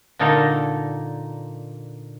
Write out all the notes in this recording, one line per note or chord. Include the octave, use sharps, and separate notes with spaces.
A#2 D3 A#3 D#4 A4 A#5